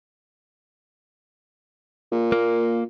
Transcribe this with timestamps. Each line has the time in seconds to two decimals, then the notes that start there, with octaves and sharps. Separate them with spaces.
2.12 A#2
2.32 A#3